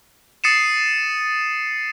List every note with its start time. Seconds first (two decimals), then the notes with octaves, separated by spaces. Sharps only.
0.44 D#6 A6 C7 C#7 D#7 E7